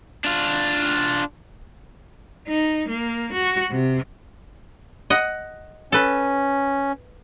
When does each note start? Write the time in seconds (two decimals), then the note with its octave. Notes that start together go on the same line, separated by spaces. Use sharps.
0.24 D4 F4
2.48 D#4
2.88 A#3
3.33 F#4
3.71 C3
5.10 D#5 F#5
5.92 C#4 A4 B4